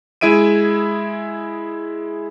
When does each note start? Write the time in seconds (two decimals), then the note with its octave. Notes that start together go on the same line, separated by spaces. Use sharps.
0.21 G#3 E4 G#4 E5 D7 D#7